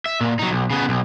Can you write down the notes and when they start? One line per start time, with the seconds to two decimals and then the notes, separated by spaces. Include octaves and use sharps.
0.06 E5
0.21 A#2
0.39 F#3 D#4
0.51 B1
0.70 C#3 B3
0.89 B1